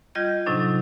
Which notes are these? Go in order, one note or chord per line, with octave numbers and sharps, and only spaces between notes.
G3 F4 D#5 G6 G#6
A2 C3 F#3 D4 D#4